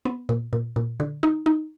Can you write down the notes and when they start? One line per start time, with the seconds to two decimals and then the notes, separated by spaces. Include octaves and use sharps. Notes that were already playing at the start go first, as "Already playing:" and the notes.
0.05 B3
0.29 A#2
0.53 A#2
0.76 A#2
1.00 D3
1.23 D#4
1.46 D#4